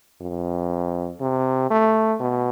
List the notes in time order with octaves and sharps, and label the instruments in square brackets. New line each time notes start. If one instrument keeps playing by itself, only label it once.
[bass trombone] F2
C3
A3
B2